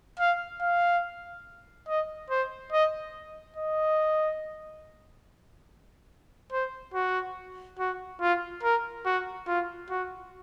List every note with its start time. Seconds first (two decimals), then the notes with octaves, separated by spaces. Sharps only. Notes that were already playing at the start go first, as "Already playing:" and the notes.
0.19 F5
0.61 F5
1.88 D#5
2.30 C5
2.72 D#5
3.56 D#5
6.52 C5
6.94 F#4
7.79 F#4
8.21 F4
8.63 A#4
9.05 F#4
9.47 F4
9.90 F#4